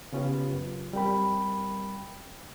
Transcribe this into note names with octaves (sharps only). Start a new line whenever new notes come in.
C#3 B3 C#4 F4 G4 B4
F#2
G3 C4 A#4 G5 B5